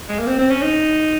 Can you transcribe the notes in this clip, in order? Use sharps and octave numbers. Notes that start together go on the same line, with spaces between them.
G#3
A#3
C4
C4
C#4
D#4